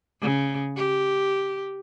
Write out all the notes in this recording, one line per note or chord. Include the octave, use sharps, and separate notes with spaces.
C#3
G4